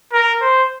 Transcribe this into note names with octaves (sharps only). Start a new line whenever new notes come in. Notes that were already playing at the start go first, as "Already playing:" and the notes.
A#4
C5